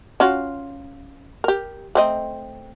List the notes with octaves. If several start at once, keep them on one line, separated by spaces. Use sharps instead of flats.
C#4 F4 F#4
G4 A#4
A3 C4 D#5